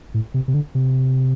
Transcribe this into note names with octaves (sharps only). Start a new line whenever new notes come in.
A2
C3
C3
D3
C3